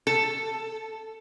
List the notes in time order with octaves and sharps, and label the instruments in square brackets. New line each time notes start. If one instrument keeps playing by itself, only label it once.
[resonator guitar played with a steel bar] A4